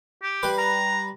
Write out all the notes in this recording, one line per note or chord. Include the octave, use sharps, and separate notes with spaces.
G4
G3 B4 C6
A#5